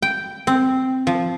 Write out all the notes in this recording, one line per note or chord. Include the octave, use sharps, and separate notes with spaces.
G5
C4
F3